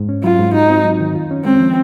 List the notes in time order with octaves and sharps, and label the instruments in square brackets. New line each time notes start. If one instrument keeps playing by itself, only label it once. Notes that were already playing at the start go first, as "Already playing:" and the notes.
Already playing: [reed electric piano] G#2
C#4
[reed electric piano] F#3 [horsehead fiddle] F4
[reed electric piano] G#2
[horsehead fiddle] D#4 [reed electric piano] F#4
[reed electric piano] C4
F#3
D#3
F4
C#4
[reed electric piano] G#3 [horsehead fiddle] C4
[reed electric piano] F3